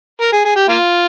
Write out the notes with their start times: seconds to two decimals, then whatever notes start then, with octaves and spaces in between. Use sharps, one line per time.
0.21 A#4
0.32 G#4
0.45 G#4
0.56 G4
0.68 A#3 F4